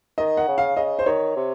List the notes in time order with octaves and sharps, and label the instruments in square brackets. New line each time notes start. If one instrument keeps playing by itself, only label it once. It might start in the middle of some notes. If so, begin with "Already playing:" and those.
[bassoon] D#3 [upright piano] D#5
[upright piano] F#5
[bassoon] C#3
[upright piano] F5
[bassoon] C#3 [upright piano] D#5
[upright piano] C5
[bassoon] D#3 [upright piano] C#5
[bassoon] C3